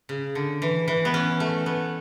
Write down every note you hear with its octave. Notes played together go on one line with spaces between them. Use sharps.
C#3
D3
E3
E3
B3
C#4
A3
B3